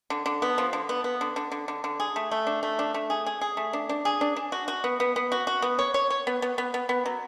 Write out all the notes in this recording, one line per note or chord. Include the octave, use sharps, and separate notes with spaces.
D3
D3
B3
F3
D3
B3
B3
D3
D3
D3
D3
D3
G#4
A3
A3
D4
A3
D4
A3
G#4
G#4
G#4
A3
D4
D4
G#4
D4
D4
F#4
F#4
B3
B3
B3
F#4
F#4
B3
C#5
C#5
C#5
B3
B3
B3
B3
B3
F#3